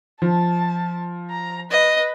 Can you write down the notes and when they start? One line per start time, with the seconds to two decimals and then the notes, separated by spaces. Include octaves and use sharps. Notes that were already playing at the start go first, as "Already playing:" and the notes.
0.22 F3 A5
1.30 A#5
1.71 B4 D#5